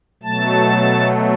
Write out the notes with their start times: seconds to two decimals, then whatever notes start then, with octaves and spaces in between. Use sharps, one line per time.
0.23 B2 F#3 A3 A5